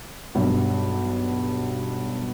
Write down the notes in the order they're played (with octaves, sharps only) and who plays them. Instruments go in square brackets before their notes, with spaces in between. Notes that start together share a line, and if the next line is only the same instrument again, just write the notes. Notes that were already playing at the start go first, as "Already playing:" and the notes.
[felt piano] B1 G2